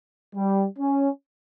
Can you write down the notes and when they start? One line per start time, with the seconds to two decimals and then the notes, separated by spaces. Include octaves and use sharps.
0.36 G3
0.79 C#4